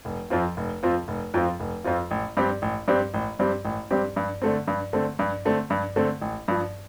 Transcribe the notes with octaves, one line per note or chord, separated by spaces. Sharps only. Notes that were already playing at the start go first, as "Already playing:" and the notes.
F1
F2 F3 C4 F4
F1
F2 F3 C4 F4
F1
F2 F3 C4 F4
F1
F2 F3 C4 F4
A1
G2 G3 C4 G4
A1
G2 G3 C4 G4
A1
G2 G3 C4 G4
A1
G2 G3 C4 G4
G2
D3 A3 C4
G2
D3 A3 C4
G2
D3 A3 C4
G2
D3 A3 C4
A1
G2 F3